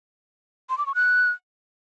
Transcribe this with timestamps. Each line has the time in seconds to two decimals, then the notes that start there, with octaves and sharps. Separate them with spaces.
0.70 C6
0.78 D6
0.86 C#6
0.95 F#6